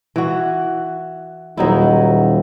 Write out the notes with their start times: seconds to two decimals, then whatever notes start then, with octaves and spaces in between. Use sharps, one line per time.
0.16 E3 F#4
1.57 D#1 F#3 D#4 E4